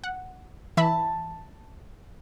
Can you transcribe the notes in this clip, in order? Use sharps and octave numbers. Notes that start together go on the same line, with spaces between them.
F#5
E3 E5 A5 B5